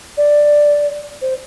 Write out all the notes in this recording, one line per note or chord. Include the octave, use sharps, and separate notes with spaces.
D5
C5